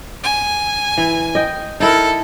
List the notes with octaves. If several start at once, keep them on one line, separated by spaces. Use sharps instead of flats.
G#5
E3
D#5 G5
D#4 E4 A4 A#4